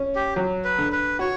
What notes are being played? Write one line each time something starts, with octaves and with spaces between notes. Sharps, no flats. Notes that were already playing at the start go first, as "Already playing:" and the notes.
Already playing: C#4
G4
F#3
B4
D3
B4
F#4 C#5